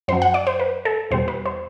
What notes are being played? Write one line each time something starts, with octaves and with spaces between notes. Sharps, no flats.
F#2 F#3 C5
F#5
D5
C5
B4
A4
E2 B2 G3 C5
B4
C5